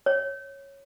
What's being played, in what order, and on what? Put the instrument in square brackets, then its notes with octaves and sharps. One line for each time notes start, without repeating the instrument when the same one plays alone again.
[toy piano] C#5